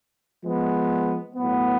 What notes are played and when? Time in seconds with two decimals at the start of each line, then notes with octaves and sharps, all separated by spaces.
0.42 F3 G#3 B3
1.36 A2 F#3 B3